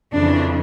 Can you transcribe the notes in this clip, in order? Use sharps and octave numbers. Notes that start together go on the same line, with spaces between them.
F2 C#3 E3 D4